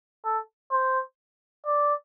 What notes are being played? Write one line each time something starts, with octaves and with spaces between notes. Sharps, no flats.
A4
C5
D5